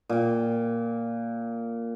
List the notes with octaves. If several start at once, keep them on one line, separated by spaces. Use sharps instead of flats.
A#2 G5